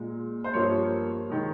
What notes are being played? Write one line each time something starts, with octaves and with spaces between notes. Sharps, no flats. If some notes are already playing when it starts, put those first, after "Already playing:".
Already playing: A#2 G#3
C5
G2 F3 A#3 C#5
D#3 G#3